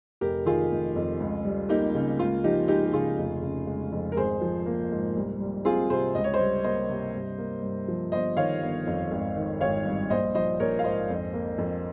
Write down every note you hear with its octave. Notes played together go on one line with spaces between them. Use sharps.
F1 G4 A#4
D#3 F4 G#4
F1
F2
C#2
G3
A#3 D#4 G4
C#3
C#2 F4
F3 D#4 G4
G#3 D#4 G4
G4
C#3 F4 G#4
F1
C#3
G#3
F2
A#4
G#1 G#4 C5
F3
A#3
G#2
C2
G3
C4 F4 G#4
C3 G#4 C5
C#2 D#5
C#5
C5 D#5
G3
A#3 C5 D#5
C3
G2
A#3
G2
F3
G1 C5 D#5
D#3 C#5 F5
G1
F2
G#1
D#3
G#1 C#5 F5
G2
A#1 C5 D#5
F3 C5 D#5
A#1 A#4 C#5
F5
G#2 C5 D#5
F2
A#3
F2